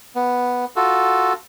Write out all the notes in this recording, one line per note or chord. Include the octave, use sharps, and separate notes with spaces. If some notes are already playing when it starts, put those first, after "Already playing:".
B3
F4 F#4 A4